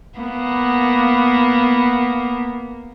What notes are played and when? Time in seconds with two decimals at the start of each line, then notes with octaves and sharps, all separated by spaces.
0.18 A#3 B3